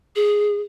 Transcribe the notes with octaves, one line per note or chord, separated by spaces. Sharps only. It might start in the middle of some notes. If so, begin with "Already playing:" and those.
G#4